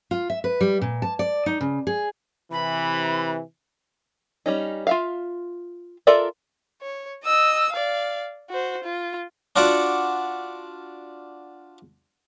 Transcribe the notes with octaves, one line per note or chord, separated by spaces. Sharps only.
F4
E5
B4
G3
A#2
A5
D5
D#4
C#3
G#4
C3 E3 B5
G3 C#4 D#4
F4 E5 F5
F4 A4 A#4 D5 E5
C#5
D#5 E6
D5 F5
F#4 C5
F4
D4 F4 F#4 D5 E5 F#5